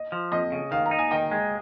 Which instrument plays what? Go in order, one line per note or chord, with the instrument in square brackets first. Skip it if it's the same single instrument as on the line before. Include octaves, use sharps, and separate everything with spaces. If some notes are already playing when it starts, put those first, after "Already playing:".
Already playing: [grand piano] D#5
[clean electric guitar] F3
[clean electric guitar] F2 [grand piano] D#5
[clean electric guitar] C#3
[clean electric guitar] D#3 [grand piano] F5
[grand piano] A#5
[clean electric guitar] D#4
[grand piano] G#5
[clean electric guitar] D#3 [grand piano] D#5 G5
[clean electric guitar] G#3